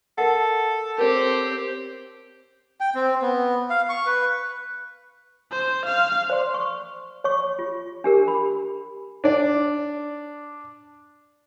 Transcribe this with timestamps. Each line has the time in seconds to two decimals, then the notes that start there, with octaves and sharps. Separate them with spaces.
0.18 A4 A#4 E5 F#5
0.98 C4 G4 A#4 C#5
2.81 G5
2.95 C4
3.22 B3
3.70 F5
3.89 C#6
4.06 B4
5.52 C5
5.85 F5
6.30 C5 D5 C6
6.54 C#6
7.24 C#5 C#6
7.59 F4
8.04 D4 G4 A#4
8.28 B5
9.24 D4 D5